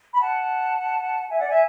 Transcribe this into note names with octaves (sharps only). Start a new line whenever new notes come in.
B5
F#5 A5
E5 G#5
D5 F#5
E5 G#5